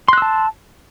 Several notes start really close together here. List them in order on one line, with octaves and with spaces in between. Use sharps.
C6 F#6 E6 A5